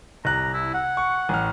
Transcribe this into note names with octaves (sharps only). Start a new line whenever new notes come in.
C2 A#5 F#6
E4
F#5
C#6
A1 F6